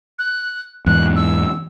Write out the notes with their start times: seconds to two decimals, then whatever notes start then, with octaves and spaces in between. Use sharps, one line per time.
0.19 F#6
0.86 E2 G#2 F#6
1.16 E6